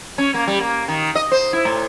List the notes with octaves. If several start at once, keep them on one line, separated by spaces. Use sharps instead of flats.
C#4
A#3
G3
A#3
D#3
D#5
C5
E4
A2